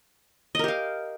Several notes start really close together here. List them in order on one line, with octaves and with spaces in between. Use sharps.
D#5 A#4 G4 F5